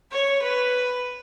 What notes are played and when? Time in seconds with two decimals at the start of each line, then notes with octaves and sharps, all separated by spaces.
0.11 C#5
0.42 B4